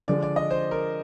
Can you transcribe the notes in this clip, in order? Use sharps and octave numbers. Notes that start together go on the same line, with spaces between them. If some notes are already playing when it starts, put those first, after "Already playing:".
D3 F3 G#3 D5
D5
D#5
C5
A#4